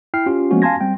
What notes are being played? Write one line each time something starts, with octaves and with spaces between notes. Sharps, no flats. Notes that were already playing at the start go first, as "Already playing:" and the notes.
E4 G5 F6 C7
C#4 F4 G4
F3 G#3 A#3 B3 C#4 F#4
F5 G#5 A5 C6 G#6 A#6
G3 C4 G5